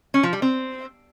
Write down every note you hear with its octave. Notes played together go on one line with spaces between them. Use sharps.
C#4
F3
G3
C4